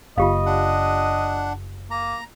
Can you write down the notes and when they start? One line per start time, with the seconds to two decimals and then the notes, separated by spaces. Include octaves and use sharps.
0.18 F#1 F4 G4 D#5 F5
0.46 D4 F#5
1.91 A#3 A#5